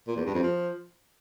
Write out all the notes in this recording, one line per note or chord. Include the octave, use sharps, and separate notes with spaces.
A#2
E2
G2
F2
F3